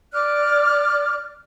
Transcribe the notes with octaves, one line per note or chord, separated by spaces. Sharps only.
D5 D6 F6 F#6